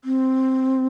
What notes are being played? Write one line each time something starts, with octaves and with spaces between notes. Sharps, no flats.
C4